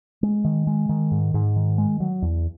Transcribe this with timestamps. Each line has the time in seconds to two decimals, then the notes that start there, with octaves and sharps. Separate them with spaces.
0.23 G#3
0.44 D#3
0.67 G#3
0.89 D#3
1.12 G#2
1.34 G#2
1.56 D#3
1.78 G#3
2.00 F#3
2.22 E2